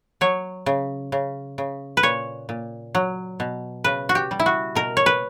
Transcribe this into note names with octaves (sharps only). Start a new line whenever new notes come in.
F#3 C#5
C#3
C#3
C#3
B4
A#2 C#5
A#2
F#3
B2
C#3 B4
F#4
G4
G3
E4
F#4
B2 A#4
C#5
B4